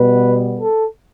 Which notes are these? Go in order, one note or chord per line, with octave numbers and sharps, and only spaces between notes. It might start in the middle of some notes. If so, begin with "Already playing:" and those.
Already playing: B2 G3 B3 B4
A4